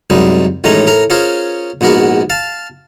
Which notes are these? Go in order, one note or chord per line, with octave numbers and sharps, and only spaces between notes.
C2 F#2 G3 G#3 D#4
A1 A2 D#3 G#3 C#4 A#5
A2 A#4 A#5
C#4 F4 G#4 A#4 C5
A#1 G#2 B3 F#4 A#4
F5 A5